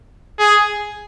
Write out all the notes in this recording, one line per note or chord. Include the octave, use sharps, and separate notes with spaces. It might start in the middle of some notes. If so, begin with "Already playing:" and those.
G#4